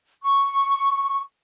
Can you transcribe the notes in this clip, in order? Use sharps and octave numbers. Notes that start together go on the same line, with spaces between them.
C#6